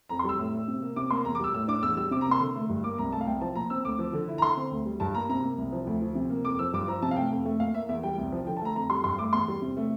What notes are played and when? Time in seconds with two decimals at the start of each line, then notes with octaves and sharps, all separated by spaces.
0.09 F2 A#5
0.19 C6
0.24 G3
0.29 E6
0.38 A2
0.53 A3
0.68 C3
0.82 A#3
0.96 C3 D6
1.11 A#3 C6
1.25 E2 A#5
1.35 D6
1.40 G3 E6
1.54 A2 E6
1.68 D4 D6
1.82 E2 E6
1.97 G3 E6
2.11 C3 D6
2.21 A#5
2.27 A#3 C6
2.40 D3
2.56 A3
2.70 G2
2.84 A#3 D6
2.98 C2 A#5
3.12 A3 A5
3.21 F5
3.27 C2 G5
3.41 F3 A5
3.55 A#2 A#5
3.70 C4 E6
3.85 D2 D6
3.99 F3
4.13 D3
4.28 E4
4.38 A#5
4.42 D3 C6
4.57 C4
4.71 D2
4.86 G3
5.00 G2 A5
5.15 A#3 A#5
5.29 C3 A#5
5.44 A#3
5.58 C2
5.72 F3
5.87 D2
6.02 F3
6.15 C3
6.30 A#3
6.45 F2 D6
6.59 F3 E6
6.74 G2 D6
6.88 F3 A#5
7.02 C3 A5
7.11 F5
7.16 A3 G5
7.31 F2
7.45 A3
7.60 A#2 F5
7.74 A#3 E5
7.89 E2 E5
8.03 G3 G5
8.18 C2
8.32 F3
8.46 D3 G5
8.57 A5
8.61 A3 A#5
8.75 F2 A#5
8.90 G3 C6
9.04 G2 C6
9.18 A3 D6
9.33 E2 C6
9.48 G3
9.62 C3
9.77 A3